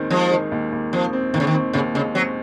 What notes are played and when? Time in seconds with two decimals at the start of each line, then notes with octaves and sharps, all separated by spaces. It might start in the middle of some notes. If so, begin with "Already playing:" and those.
Already playing: D#2 D#3 G#3 C4
0.10 F3 G#3
0.31 D#3
0.52 D#2
0.72 D#2
0.92 F3 C4
1.13 C4
1.34 D#2 D#3
1.40 C#3
1.47 D#3
1.54 C4
1.73 D#2 C#3
1.94 C#3 G#3
2.15 F#3 C4